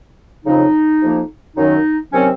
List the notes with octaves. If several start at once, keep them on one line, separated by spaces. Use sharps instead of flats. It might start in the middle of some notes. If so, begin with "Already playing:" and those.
F2 C#3 F#3 D#4
F2 C3 F3 A#3
F#2 D#3 F#3 D#4
C3 D#3 F#3 C4 C#4